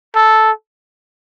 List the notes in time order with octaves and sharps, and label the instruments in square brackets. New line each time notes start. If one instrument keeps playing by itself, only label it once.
[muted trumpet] A4